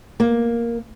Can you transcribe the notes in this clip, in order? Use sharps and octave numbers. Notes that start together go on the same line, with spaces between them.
A#3